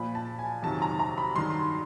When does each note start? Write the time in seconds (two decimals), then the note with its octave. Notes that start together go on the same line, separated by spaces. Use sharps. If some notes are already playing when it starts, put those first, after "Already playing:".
Already playing: A#2 F3 B5
0.15 A5
0.39 G#5
0.63 F2 C3 D#3 F#3 A5
0.82 A#5
0.99 A#5
1.18 B5
1.36 G2 D#3 F#3 C6